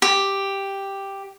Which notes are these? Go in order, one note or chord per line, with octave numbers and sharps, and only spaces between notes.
G4